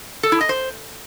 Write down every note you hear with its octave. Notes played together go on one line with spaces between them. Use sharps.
A4
E4
D#5
C5